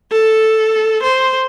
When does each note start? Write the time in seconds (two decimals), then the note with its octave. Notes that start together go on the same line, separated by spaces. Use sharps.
0.12 A4
1.03 C5